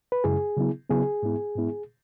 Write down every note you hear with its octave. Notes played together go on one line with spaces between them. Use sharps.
B4
F#2 C#3 G#3 E4 G#4
C#3 F#3 B3 E4
C#3 F#3 B3 E4 G#4
G#2 G#3 B3 E4
G#2 G#3 B3 E4